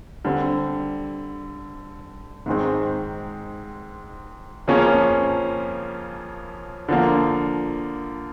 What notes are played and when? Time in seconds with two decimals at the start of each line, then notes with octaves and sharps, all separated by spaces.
0.25 D3 G3 C4
2.46 G#2 D#3 G#3 C4
4.68 F2 C#3 F3 A#3 C#4
6.88 D3 F3 A#3